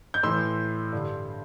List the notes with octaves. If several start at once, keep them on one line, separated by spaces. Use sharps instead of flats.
G6
A2 E3 C6 E6
G2 D3